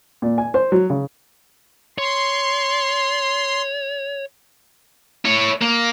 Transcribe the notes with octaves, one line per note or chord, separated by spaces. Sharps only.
A#2
G#5
C5
F#3
C#3
C#5 C6
E4 C#5
A#3